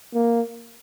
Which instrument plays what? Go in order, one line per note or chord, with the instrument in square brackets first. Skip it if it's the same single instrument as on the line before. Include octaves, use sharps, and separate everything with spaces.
[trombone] A#3